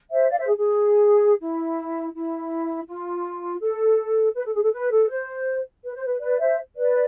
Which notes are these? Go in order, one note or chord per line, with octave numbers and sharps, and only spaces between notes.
C5 E5
D5 F5
C5 E5
G#4
G#4
E4
E4
F4
A4
B4
A4
G#4
A4
B4
A4
C5
B4
C5
B4
B4 D5
C5 E5
B4 D5